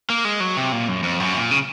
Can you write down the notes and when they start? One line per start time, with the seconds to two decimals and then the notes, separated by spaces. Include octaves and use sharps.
0.10 A#3
0.25 G#3
0.40 F#3
0.57 C3
0.72 A#2
0.88 F#2
1.03 F2
1.20 F#2
1.35 A#2
1.51 C#3